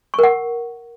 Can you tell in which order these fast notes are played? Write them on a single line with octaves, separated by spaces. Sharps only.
C#6 A#4 F#5